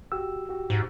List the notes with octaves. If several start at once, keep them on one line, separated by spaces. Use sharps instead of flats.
F#4 G4 E6
F#4 G4
G#2